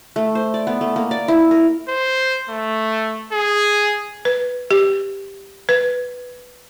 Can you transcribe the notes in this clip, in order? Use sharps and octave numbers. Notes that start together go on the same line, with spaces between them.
A3
C5
D5
B3
A3
A#3
D5
E4
A#4
C5
A3
G#4
B4
G4
B4